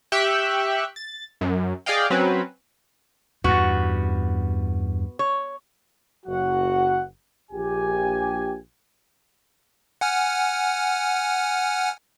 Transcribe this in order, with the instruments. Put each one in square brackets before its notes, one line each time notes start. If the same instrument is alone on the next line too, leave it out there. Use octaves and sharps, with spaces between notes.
[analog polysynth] G4 E5 G5 C#6 E6 F#6
A6
F#2
G#4 D5 D#5 F5 G5
F#3 C4 C#4 B4
[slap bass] E2 G2 [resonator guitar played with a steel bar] B3 F#4
[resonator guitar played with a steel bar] C#5
[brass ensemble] F#1 F#3 F#4 F#5
A#1 G4 G#5
[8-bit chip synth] F#5 G#5 F6